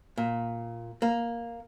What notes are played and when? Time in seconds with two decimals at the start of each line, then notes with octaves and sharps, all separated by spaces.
0.18 A#2
1.02 A#3